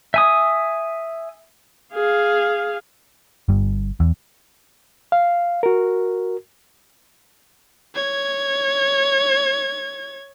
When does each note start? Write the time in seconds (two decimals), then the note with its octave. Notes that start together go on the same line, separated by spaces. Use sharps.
0.14 E5 G#5 D#6
1.93 G#4 F5
3.49 G1 G2
4.00 E2
5.12 F5
5.63 F#4 A#4
7.95 C#5 G#6